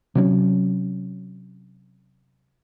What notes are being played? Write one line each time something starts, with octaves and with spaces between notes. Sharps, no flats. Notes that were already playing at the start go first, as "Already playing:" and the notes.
C3 F#3 C#4